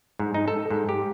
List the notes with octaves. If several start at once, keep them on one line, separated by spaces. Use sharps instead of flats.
G#2
D#4
A4
G#2
G4